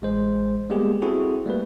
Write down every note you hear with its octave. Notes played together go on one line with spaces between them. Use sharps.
A1 G#3 C5
G3 G#3 A#3 B3 G4 G#4
C4 E4 F#4 G#4 A4
G3 A3 A#3 B4